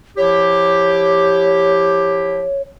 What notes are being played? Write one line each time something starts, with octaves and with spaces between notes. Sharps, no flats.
F3 E4 G4 C#5